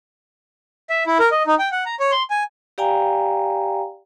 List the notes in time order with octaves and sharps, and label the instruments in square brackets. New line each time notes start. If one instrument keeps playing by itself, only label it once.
[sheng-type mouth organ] E5
E4
A#4
D#5
D#4
G5
F#5
A#5
C#5
C6
G#5
[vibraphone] G4 D5 F5 G5 G#5 A#5